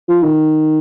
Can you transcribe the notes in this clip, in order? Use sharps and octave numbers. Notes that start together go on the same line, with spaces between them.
F3
D#3